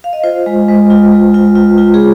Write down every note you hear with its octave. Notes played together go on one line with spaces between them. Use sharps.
F5
D#5
F4 C5
G#3
G#3
F4
G#3
F4
F4
F4
G#4